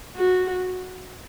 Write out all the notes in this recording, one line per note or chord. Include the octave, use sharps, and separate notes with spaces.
F#4